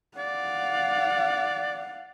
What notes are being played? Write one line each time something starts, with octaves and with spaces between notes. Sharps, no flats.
D5 F5 F#5